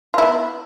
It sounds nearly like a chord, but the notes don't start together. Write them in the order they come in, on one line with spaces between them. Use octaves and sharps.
F4 E4 B3